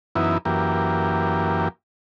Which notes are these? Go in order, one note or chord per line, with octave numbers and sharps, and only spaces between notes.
F#2 E3 B3 D#4 E4
F#2 E3 A#3 G4